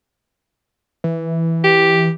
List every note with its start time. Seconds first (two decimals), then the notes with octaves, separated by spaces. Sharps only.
1.04 E3
1.64 G4